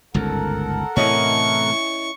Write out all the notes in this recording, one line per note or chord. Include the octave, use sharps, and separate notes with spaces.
G1 C#2 G#2 A4 A#4 F#5
A2 C3 E3 C#4 E4 D#5 C#6